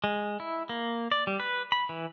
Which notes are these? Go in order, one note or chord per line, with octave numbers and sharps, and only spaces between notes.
G#3
E4
A#3
D5
G3
B4
B5
E3